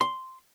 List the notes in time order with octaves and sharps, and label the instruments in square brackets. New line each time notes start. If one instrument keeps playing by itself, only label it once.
[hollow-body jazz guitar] C6